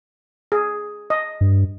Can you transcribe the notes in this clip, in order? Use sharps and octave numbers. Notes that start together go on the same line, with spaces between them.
G#4
D#5
G2